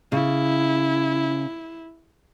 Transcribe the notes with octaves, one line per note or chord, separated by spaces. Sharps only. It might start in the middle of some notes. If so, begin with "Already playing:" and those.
C#3 E4